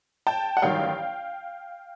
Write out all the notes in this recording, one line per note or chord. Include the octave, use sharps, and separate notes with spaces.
G5 A5
F#5
A1 G2 D#3 F#3 F5 G5